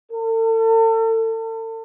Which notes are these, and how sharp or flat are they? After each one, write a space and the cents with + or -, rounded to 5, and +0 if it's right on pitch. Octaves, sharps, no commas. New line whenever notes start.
A4 +40